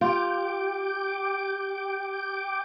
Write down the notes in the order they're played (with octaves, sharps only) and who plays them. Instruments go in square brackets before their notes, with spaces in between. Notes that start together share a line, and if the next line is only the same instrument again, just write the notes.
[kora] F4 [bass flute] G4 [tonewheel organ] G5 D6